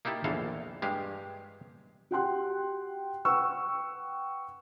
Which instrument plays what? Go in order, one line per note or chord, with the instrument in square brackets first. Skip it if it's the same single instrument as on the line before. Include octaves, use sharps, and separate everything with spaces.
[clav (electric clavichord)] A#3 D#4 E4 G4 A5
A#1 E2 D#3 E3 A4 F5
G2 G#3 G4 F5
[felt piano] F#4 G4 F#5 G5 C6 F#6
B4 F#5 G5 C#6 E6